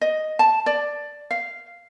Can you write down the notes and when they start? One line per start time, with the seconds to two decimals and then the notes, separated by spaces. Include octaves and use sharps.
0.01 D#5
0.39 A5
0.66 D5
1.31 F5